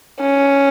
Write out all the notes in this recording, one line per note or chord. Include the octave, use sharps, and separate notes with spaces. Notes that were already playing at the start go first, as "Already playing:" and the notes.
C#4